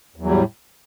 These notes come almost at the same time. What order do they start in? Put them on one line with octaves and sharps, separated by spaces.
E2 F#3 G3 A2